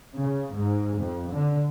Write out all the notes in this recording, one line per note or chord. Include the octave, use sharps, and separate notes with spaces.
C#3
G#2
F2
D3